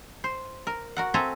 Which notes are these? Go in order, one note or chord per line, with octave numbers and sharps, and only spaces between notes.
C5
A#4
F#4 A#4 F#5
C4 A4 E5 G#5 A#5